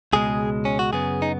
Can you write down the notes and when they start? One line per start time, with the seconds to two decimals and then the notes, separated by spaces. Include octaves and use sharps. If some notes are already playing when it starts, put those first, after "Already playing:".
0.13 C#2 B2 G#3 G#4
0.65 C#4
0.79 F#4
0.92 F#2 C#3 B3 G#4
1.22 D#4